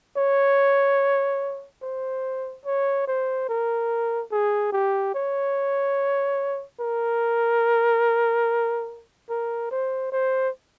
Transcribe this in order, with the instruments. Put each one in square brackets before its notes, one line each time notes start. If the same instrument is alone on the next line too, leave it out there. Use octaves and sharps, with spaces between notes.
[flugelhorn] C#5
C5
C#5
C5
A#4
G#4
G4
C#5
A#4
A#4
C5
C5